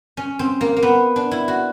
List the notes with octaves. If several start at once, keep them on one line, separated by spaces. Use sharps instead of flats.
C#4
C4
A#3
A#3
B3
D4
E4
F#4